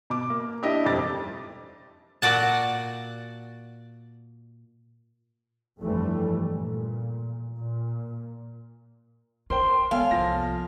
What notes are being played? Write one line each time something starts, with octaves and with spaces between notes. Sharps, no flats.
B2 D6
A#3
D4 E4 G4 D#5
E1 F2 G3 D6 A6
A#2 F#4 D5 F#5 A5
G1 F2 E3 G3 A3
A#2
A#2
F4 A#4 C5 G5 C6
G#3 B3 A4 C#5 F5 G5 G#5
C2 F3 A#3 A#6